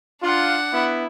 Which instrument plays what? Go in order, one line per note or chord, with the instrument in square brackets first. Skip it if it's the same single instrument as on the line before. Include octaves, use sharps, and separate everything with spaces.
[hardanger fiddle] D4 F#5 [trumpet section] F4
[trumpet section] B3 E4